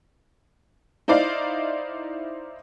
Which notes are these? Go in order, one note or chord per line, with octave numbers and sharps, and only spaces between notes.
D#4 E4 C5 D5 F5